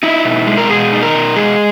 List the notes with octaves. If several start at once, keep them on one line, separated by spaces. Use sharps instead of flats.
D#4 E4
B2
G#3
A#4
B2 G#4
D#4
A#4
B2
G#3 G#4